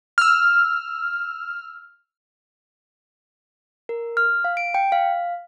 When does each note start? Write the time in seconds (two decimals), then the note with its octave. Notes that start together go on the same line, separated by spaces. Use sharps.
0.18 E6 F6
3.89 A#4
4.17 F6
4.44 F5
4.57 D7
4.74 G5
4.92 F5